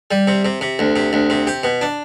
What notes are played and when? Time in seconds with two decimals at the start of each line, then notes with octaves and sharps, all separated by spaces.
0.11 G3
0.27 C3
0.45 C3
0.61 C3
0.79 D2
0.96 C3
1.13 D2
1.30 C3
1.47 G4
1.63 B2
1.81 D4